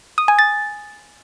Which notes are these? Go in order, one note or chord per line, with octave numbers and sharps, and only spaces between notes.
D#6
G#5
A6